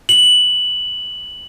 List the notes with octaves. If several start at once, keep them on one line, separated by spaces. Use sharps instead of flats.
F#7